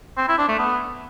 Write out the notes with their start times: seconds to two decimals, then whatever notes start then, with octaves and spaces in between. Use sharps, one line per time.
0.18 C4
0.28 E4
0.38 D4
0.48 A3
0.59 B3